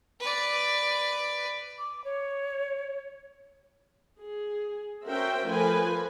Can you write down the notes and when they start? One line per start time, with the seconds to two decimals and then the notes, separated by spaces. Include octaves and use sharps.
0.20 B4 D5
1.79 D6
2.04 C#5
4.20 G#4
5.05 C#4 F#4 A#4 C5 E5 G5
5.47 F3 A3 F4 A#4 B4 G#5